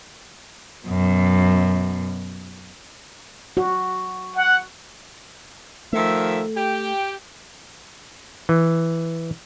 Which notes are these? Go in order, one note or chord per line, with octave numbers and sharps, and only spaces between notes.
F#2 B2
F#4
F#5
D#3 F3 A3 E5
G4 G5
E3